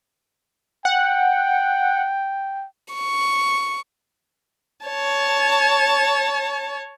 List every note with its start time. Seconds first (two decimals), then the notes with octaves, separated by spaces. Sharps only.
0.85 F#5 G5
2.94 C#6
4.85 C#5 A5